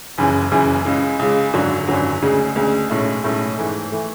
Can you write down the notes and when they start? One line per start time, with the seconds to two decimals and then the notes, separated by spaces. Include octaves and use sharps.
0.18 F#1 F#2 C#3 E3
0.51 F#1 F#2 C#3 E3
0.85 C#2 C#3 G#3
1.19 C#2 C#3 G#3
1.54 G#1 F#2 D3 F#3
1.87 G#1 F#2 D3 F#3
2.22 D2 C#3 G#3
2.56 D2 C#3 G#3
2.90 B1 A2 G#3 C#4 E4
3.24 B1 A2 G#3 C#4 E4
3.58 G#2 E3 A3
3.92 E3 A3